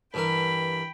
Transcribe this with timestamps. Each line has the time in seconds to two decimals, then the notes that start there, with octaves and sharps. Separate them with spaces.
0.14 G2 E3 A#4 G5 B5